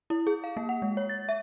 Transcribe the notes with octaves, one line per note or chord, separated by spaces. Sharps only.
E4
G#4
F5
A#3
F#5
G#3
C#5
A6
E5